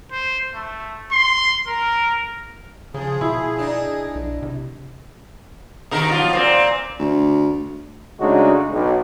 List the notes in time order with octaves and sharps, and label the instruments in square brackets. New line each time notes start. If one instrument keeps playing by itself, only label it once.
[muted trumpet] C5
A3
C6
A#4
[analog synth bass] C#3 [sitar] F3 [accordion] G#4
[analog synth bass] B2 [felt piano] E4
[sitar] D4 D#4
[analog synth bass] B1
C3
[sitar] B2 D#3 A#4
F3 F#3 F4
A#2 C4
[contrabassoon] D2
[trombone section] C#3 G#3 A3 D4 D#4 F#4
B1